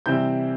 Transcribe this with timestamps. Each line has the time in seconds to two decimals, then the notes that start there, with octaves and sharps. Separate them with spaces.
0.06 C3 E3 G3 C4 G6